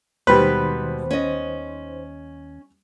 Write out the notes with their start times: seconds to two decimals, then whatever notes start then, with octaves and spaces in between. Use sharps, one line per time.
0.27 D#2 B2 D#3 G3 G#3 B4 C5
1.11 C#4 D#5